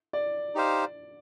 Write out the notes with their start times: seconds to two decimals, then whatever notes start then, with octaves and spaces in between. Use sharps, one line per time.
0.13 D5
0.55 D#4 G4 C5 F5